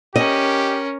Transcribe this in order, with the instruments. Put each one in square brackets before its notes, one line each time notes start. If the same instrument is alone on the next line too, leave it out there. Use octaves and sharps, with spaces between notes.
[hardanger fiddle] C#4 A#4 [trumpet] G4 [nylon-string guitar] D#5